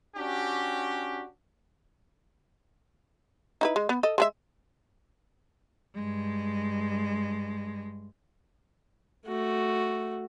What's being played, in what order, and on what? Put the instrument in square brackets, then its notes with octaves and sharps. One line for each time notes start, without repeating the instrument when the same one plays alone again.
[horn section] C#4 D4 F#4 G4
[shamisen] D#4 E4 B4
G#3
B3
A4 D#5
G#3 G#4 E5
[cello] G2 G#3
[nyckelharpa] A3 F#4